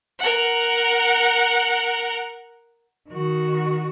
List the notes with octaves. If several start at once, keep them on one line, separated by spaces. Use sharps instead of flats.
A#4 F#5
D#3 F#4